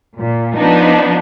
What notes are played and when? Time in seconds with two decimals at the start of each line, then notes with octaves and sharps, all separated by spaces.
0.18 A#2
0.55 F3 B3 D4 D#4